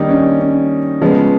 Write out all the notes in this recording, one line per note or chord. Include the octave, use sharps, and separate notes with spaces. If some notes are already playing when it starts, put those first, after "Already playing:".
Already playing: D#3 G3 A#3 D4 D#4
C#4
C#4
C#3 F3 G#3 B3